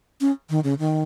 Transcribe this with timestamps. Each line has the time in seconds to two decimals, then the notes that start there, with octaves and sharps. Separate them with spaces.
0.21 C#4
0.50 D#3
0.64 C#3
0.79 D#3